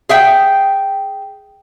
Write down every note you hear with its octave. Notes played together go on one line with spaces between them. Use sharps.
G#4 E5 G5